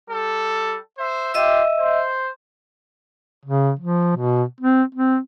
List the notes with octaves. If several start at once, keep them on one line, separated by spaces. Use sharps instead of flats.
G3 A4
C5 E5
F4 G4 D#5 E5 E6
C5
C#3
F3
B2
C4
C4